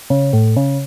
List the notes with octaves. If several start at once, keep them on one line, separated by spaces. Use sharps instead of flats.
C#3
A2
C#3